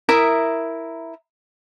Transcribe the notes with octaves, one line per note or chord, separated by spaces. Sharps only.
E4 A#4 E5 D#6